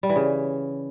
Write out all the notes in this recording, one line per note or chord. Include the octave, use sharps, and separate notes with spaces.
G3
E3
C#3